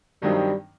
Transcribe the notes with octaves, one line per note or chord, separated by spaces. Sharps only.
G2 D#3 F#3 G3 C4 D#4